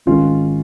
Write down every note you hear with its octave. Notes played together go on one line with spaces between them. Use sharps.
G#1 G#2 D#3 C#4 F4